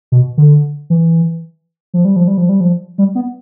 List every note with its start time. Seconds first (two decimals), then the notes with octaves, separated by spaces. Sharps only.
0.12 B2
0.38 D3
0.90 E3
1.94 F3
2.05 G3
2.16 F3
2.28 G3
2.37 F3
2.49 G3
2.60 F3
2.98 G3
3.15 B3